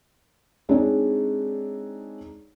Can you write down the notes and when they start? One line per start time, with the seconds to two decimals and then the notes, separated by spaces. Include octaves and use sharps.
0.69 G#3 C4 D4 D#4 G#4 C#5